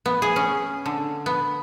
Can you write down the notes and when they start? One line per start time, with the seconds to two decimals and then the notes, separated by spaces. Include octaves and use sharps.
0.06 B3
0.22 G#4
0.36 C#4
0.86 D3
1.26 B3